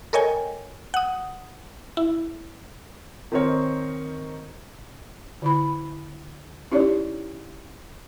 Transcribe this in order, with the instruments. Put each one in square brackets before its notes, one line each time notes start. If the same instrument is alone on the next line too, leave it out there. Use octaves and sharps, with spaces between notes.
[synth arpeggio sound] A4 A#4 C#5 D#5 G5 G#5
F#5 D#6
E4
[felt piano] D#3 C4 D#4 A#4 C5 C#5
[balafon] D3 E4 B5
C#4 D#4 E4 G4 C#5 D5